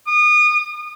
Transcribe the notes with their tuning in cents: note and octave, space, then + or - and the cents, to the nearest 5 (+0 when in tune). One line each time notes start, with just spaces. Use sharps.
D#6 -30